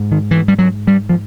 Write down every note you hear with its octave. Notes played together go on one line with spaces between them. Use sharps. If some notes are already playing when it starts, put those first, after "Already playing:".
Already playing: G#2
D#3
E3
G3
F#3
G3
F3